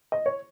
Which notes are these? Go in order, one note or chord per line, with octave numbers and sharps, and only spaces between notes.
D#5
C#5